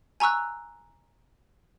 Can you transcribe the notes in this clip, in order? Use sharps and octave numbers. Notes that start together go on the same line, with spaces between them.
G#5 A#5 C#6 E6 F#6